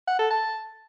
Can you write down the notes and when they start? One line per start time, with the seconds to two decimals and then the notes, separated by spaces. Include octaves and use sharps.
0.08 F#5
0.19 A4
0.30 A5